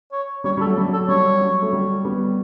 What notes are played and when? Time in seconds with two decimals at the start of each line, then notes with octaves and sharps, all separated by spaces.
0.12 C#5
0.44 G3 C#5
0.57 G3 A4
0.66 F#3 A3
0.77 G3
0.88 F#3
0.93 A4
1.08 G3 C#5
1.41 F#3
1.62 A3
1.73 G3
2.05 G3 B3